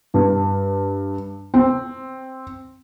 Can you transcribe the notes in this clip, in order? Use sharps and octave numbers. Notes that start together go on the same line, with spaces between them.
G2
C4